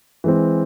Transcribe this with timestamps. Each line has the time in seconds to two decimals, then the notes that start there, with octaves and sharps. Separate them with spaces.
0.24 E3 G#3 C4